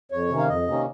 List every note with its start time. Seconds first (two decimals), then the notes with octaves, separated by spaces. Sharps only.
0.11 F2 C#5
0.30 C3 D#3 A#3 C#4
0.39 F5
0.48 F2 D#5
0.67 C3 D#3 A#3 C#4